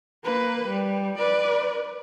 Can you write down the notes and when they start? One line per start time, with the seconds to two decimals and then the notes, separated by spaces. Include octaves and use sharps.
0.24 A#3 B4
0.68 G3
1.19 B4 D5